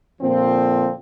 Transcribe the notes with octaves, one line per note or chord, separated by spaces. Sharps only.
A#2 D3 F3 C4